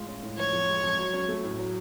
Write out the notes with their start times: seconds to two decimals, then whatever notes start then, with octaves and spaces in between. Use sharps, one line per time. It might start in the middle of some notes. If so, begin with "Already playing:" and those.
Already playing: A2 G#3 F4
0.08 C#4
0.23 A2
0.38 F3 C#5
0.53 F2
0.68 G#3
0.84 F2
0.98 F#3
1.13 C#4
1.28 A3
1.44 A2
1.59 F#3